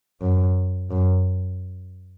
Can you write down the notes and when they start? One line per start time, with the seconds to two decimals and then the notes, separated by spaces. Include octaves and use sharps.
0.22 F#2
0.91 F#2